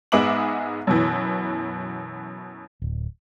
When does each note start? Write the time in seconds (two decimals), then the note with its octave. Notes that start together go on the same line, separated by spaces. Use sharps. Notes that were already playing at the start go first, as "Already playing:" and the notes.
0.12 G#2 G#3 B3 E5 D6 F#7
0.87 F#2 B2 E3
2.82 D1